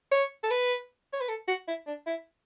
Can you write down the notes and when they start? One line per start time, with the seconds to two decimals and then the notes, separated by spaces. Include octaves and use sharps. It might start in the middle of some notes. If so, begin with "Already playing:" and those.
0.12 C#5
0.43 A4
0.51 B4
1.13 C#5
1.21 B4
1.29 A4
1.48 F#4
1.68 E4
1.87 D4
2.07 E4